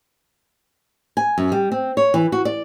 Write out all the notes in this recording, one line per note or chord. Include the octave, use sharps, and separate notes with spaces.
G#5
F#2
G3
C4
C#5
E3
F#4
D5